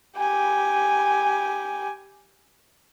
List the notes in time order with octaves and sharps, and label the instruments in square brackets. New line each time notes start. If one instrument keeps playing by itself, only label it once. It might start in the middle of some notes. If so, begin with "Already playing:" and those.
[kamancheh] G4 G#5